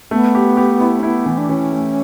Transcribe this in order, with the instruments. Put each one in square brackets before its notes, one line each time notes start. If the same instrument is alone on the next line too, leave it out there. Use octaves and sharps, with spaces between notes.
[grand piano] A3 [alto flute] B3
[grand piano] G4
G4
E4
[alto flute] C#4
[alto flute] B3 [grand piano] E4
[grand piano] E3
[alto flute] D4
[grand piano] E3 [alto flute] C#4
[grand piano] A3